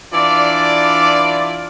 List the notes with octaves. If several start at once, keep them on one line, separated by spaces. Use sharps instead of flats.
E3 D4 F4 D5